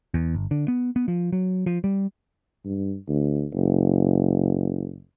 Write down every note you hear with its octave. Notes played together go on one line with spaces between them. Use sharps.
E2
G1
D3
B3
B3
F3
F#3
F3
G3
G2
D2
F#1